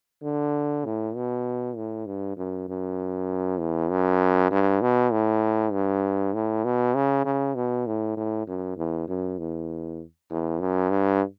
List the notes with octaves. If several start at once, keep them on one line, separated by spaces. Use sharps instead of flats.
D3
A2
B2
A2
G2
F#2
F#2
E2
F#2
G2
B2
A2
G2
A2
B2
C#3
C#3
B2
A2
A2
F#2
E2
F#2
E2
E2
F#2
G2